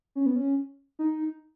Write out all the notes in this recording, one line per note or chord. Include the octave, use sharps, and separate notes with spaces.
C#4
B3
C#4
D#4